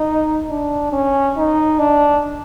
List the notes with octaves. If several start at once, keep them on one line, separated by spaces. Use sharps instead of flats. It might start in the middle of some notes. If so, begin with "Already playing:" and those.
Already playing: D#4
D4
C#4
D#4
D4